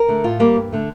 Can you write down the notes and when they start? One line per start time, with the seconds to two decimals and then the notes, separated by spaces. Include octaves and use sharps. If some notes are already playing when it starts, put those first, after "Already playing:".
Already playing: A#4
0.08 D3 A3
0.24 A2 F4
0.40 G3 A#3
0.56 G2
0.72 D3 A3